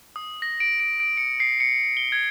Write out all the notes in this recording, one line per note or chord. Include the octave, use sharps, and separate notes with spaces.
D#6
A#6
D7
D7
D7
C#7
C7
C#7
G7
G#6